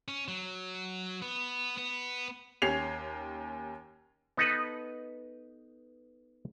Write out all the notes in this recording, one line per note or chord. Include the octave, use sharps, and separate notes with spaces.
C#4
F#3
B3
B3
D#2 C#4 G4 G#6 C7 F7
B3 D#4 A4 B4